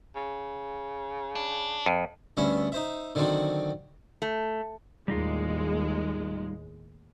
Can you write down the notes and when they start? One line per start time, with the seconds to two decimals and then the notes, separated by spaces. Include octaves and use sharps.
0.15 C#3
1.35 D4
1.86 F2
2.37 D2 G2 B3 C#4 E5
2.72 D#4 C5 E5
3.15 D3 D#3 F#3 C4 D4
4.22 A3
5.08 D#2 A2 G3 G#3 D#4 F4